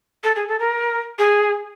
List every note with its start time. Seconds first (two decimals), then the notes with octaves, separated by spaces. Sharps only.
0.24 A4
0.36 G#4
0.48 A4
0.60 A#4
1.19 G#4